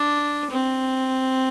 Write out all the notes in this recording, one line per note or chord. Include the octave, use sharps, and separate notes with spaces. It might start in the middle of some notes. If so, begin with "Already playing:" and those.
Already playing: D4
C4